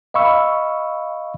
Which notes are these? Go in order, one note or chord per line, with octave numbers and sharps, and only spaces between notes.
D#5 F5 B5 C#6 E6